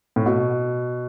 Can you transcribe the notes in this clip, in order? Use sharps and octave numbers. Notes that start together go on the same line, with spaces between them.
A2
B2